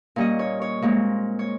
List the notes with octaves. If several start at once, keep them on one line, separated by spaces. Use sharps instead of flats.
A#2 G3 C#4 D#5
C#5
C#5
A#2 G#3 C4
C#5